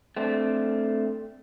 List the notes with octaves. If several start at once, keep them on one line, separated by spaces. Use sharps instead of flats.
A3 C4 D4